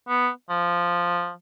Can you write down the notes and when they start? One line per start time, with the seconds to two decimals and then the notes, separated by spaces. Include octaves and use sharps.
0.09 B3
0.50 F3